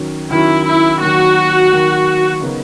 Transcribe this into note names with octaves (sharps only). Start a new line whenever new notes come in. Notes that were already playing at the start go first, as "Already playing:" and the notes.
Already playing: D#3 F#3 C#4
D#3 F#3 C#4 E4
E4
D#3 F#3 A#3 F#4
D#3 F#3 A#3
C#3 F#3 B3 D#4 A#4